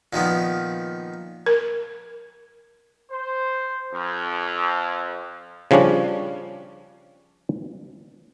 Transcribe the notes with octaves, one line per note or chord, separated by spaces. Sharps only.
A#2 D#3 F3 B3
A#4
C5
F2
C#3 F3 G3 C#4 D4